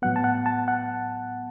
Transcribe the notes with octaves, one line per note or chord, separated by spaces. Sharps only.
A2 F#3 B3 F#5
A5
F#5
A5
F#5